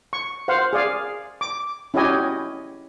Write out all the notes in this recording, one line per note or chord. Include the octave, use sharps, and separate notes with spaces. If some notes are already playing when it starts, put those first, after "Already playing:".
C#6
C5 F5 F#5
G#4 D5 F5
D6
C#4 E4 F#4 G4 D#5 G#5